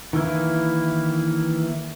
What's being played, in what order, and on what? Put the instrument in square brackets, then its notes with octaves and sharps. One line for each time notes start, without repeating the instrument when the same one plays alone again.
[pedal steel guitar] D#3 E3 A#3 E4